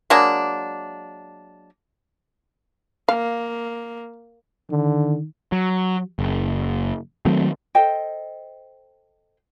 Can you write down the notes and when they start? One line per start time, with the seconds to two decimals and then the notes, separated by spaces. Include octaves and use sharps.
0.10 F#3 G#3 A#3 D4
3.09 A#3 F5
4.71 D3 D#3
5.52 F#3
6.19 F#1
7.25 D#3 F#3 A3 C4
7.75 A4 C5 D#5 G5